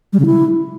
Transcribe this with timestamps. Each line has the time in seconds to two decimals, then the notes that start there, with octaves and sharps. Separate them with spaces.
0.13 G3
0.19 C#3
0.26 E4